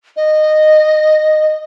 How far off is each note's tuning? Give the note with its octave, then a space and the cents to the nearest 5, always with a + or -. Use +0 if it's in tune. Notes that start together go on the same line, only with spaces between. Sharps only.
D#5 -15